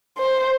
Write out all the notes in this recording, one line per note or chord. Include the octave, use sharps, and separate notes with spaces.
C5